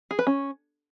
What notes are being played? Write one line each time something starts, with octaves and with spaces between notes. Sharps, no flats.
G#4
B4
C#4